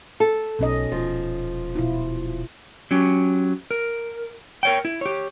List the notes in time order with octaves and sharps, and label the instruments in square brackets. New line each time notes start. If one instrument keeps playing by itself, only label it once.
[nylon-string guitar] A4
[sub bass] B1 [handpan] B2 C#4 D#5
[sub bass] D#1 [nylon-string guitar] F3
[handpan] B2 E4 F4
[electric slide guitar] F#3 C#4 G4
A#4
A#4 C#5 G5
E4
G4 C#5